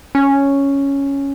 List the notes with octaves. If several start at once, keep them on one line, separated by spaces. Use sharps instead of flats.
C#4